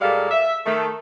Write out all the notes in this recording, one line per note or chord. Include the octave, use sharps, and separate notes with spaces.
A#2 G3 G#3 A4 F5
E5
D#3 A3